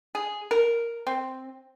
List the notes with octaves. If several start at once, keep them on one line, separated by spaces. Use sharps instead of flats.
G#4
A#4
C4